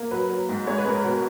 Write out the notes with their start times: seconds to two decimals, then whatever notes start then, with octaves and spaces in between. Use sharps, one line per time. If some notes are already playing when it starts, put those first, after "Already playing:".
Already playing: A#3
0.11 F#3 B4
0.29 F#3
0.49 G#2
0.67 G#3 C#5
0.78 B4
0.85 G#3 A#4
0.99 B4
1.04 B2